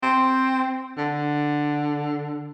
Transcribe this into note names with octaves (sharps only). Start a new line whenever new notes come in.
C4
D3